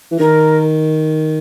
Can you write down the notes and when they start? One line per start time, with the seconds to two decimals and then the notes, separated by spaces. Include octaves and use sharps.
0.11 E3
0.19 D#3 A#4